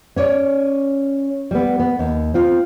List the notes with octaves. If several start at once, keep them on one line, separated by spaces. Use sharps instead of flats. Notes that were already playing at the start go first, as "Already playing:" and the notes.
C#4 C#5 D5
G3 B3
B3
D#2
C4 F4